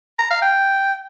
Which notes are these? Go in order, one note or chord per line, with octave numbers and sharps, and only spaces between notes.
A#5
F5
G5